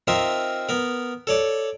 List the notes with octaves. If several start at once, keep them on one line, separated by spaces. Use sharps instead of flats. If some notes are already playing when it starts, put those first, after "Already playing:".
C4 D#4 F4 A#4 E5
B3 A#4
A4 C#5 D5